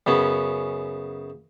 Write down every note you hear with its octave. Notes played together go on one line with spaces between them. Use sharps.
F#2 C#3 B3 C#4